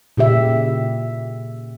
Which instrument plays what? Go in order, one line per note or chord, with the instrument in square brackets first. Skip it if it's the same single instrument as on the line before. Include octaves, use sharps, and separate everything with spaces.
[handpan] A#2 C#3 G4 E5